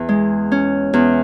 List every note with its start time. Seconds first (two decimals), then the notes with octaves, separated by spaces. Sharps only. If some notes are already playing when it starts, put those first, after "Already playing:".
Already playing: E2
0.09 G#3
0.52 C#4
0.93 E2